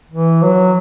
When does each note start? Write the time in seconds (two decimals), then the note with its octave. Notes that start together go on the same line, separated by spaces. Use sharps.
0.11 E3
0.43 F#3